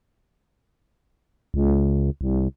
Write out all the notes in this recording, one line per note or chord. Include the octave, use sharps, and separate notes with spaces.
C#2
C2